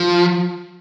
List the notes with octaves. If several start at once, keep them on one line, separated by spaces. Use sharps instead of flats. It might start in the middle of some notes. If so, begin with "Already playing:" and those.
Already playing: F3